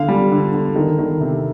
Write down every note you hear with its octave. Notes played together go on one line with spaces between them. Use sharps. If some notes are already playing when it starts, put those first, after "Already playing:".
Already playing: D3 F5
G3
D3
D3
D#3
D#3
C3